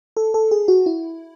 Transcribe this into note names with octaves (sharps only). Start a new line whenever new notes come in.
A4
A4
G#4
F#4
E4